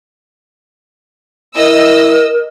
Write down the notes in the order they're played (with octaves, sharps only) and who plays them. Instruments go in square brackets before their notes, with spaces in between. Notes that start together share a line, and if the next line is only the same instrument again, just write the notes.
[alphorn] E4 [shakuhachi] A#4 [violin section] D#5 E6